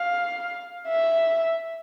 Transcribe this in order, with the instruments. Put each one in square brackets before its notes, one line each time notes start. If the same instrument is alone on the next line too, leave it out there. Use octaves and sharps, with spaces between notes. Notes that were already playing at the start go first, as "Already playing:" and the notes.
Already playing: [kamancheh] F5
E5